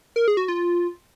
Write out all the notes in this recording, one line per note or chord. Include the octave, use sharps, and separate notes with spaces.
A#4
G#4
F#4
F4